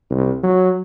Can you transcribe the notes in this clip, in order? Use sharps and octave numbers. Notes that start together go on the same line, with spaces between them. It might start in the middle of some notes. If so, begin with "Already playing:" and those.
C2
F#3